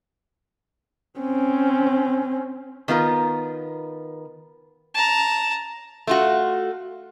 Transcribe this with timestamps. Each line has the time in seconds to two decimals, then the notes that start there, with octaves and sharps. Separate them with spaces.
1.20 C4 C#4
2.88 D#3 B3 F4 A#4
4.94 A5 A#5
6.07 A3 F4 F#4